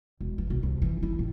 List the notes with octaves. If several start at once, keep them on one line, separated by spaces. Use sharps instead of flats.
E1
E3
B1
C2
E3
E4
A2